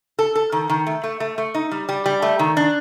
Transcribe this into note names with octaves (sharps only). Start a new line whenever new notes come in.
A4
A4
D#3
D#3
A3
A3
A3
A3
D#4
G3
G3
G3
A3
D#3
D4